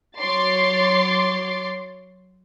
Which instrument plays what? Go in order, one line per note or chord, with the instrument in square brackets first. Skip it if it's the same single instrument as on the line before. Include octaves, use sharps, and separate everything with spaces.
[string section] F#3 C#5 C6 D6 A6